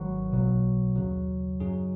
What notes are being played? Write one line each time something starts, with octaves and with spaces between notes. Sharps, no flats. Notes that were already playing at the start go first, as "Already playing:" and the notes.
Already playing: G#1 G#2 D#3 F#3 F#4 B4
B1 B2 F#3
D#2 C#3 F#3
F#2 C#3 F#3 D#4 G#4